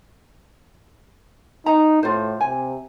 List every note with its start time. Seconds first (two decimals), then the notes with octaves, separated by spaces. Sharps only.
1.66 D#4 A#5
2.03 A2 F4 C5
2.41 C3 G#5